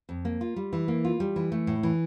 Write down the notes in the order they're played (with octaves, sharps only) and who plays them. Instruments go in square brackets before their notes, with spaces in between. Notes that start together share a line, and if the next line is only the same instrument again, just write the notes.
[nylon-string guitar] F2
A#3
F4
G3
E3
A#3
F4
G3
E3
A3
A2
E3